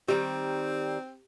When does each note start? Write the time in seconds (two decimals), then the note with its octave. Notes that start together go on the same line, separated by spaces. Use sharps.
0.08 D#3 G3 C4 G4